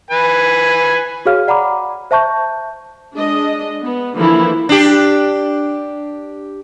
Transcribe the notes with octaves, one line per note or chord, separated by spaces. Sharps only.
B4 G#5
F#4 G#4 C#5 F5 F6
D5 F#5 A#5 B5 D6
C5 E5 A5 C#6 G6
G#3 D4 D#5
B3
D3 E3 F3 A#3 E4
D4 G4